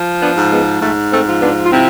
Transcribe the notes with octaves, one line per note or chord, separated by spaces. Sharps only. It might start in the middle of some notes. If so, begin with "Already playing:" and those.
Already playing: F3
B3 D4
G#2
G#3 B3
G#2 A3
A3 C4
F3
B3 D4
F4
C3 C4 E4